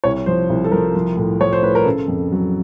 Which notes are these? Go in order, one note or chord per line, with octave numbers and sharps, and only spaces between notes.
C2 C#5
F3 C5
C2
A4
F3 A#4
F3
A2
F3 C#5
C5
A2 B4
A#4
C#3 A4
F2
F#3